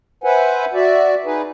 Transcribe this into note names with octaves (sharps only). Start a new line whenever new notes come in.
B4 C5 E5 F#5 G#5
F#4 D5 E5
D#4 G#4 B4